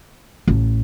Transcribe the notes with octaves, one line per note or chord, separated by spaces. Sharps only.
A1